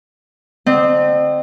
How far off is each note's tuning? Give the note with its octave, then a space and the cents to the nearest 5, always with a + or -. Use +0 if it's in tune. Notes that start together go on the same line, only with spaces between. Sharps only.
D3 +0 C4 -15 D#5 -45